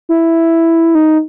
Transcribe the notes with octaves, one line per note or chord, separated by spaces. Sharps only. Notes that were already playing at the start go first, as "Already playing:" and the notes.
E4
D#4